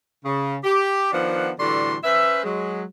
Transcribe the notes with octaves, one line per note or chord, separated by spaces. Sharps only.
C#3
G4
D#3 F3 B3 D4 F#5
A2 D3 E3 G3 F#4 C6
C#4 B4 C5 E5
F#3 G#3